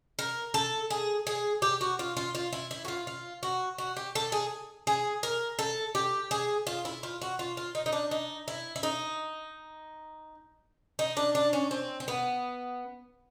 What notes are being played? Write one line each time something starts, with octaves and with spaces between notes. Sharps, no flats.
A#4
A4
G#4
G#4
G4
F#4
F4
F4
F4
E4
E4
F#4
F4
F4
F#4
F#4
G4
A4
G#4
G#4
A#4
A4
G4
G#4
F4
E4
F4
F#4
F4
F4
D#4
D#4
D4
D#4
E4
E4
D#4
D#4
D4
D4
C#4
C4
C4
B3